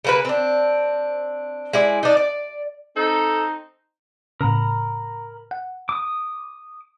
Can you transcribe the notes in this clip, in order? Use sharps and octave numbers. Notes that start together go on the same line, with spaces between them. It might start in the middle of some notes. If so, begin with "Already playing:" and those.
C#3 A#3 B4
C4 D4
G#3 E4 D5
D4 D#4
D5
C4 D#4 A4
A2 C#3 A#4 A#5 B5
F#5
D6 D#6